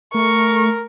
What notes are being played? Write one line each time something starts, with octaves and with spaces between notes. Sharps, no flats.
A3 A#4 C#6